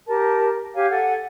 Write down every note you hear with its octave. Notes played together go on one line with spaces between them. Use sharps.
G4 A#4 A5
G4 C#5 F5 G#5
A4 F#5 G#5